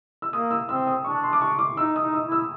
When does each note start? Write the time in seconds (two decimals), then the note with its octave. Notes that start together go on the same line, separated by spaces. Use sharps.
0.22 E6
0.33 A#3 D#6
0.51 E6
0.69 C4 E6
0.87 D#6
1.04 D4 C#6
1.23 C6
1.33 D6
1.42 C#6
1.59 D6
1.77 D#4 E6
1.96 D#6
2.01 D#4
2.13 E6
2.26 E4
2.32 E6